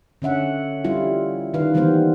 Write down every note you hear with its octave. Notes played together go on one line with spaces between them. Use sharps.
D3 C#4 E5 F#5
G3 E4 F4
D#3 B4 F5
D#3 E3 G3 A#3 B3 C5